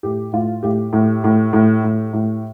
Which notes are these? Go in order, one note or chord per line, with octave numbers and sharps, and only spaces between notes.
A2 G4
A2 F4
A2 G4
A2
A2
A2
A2
A2